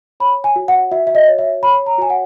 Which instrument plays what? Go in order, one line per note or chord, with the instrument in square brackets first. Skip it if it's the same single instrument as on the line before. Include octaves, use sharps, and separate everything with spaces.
[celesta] C#5 B5
G#5
F#4
F#5
F#4 E5
E5
D#5
C#5
E5
C#5 B5
A#5
F#4 G#5
F#5